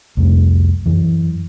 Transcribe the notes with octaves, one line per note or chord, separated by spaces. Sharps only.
C2 F2 A3
F#2 E3